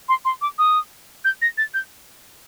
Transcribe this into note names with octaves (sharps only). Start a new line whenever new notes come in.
C6
C6
D6
D#6
G6
A#6
A6
G6